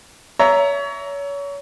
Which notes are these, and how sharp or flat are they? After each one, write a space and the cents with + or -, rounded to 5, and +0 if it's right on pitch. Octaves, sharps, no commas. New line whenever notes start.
C#5 +30 E5 +0 A#5 +0